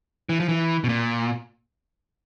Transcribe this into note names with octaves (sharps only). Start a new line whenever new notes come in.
E3
F3
E3
B2
A#2